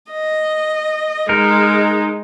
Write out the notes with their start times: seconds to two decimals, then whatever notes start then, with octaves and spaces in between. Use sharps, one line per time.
0.11 D#5
1.29 G#3 D#4 A#4